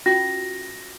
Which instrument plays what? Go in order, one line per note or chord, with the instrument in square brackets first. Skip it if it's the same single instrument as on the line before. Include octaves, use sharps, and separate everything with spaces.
[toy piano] C#4 F4 F#4 [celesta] A#6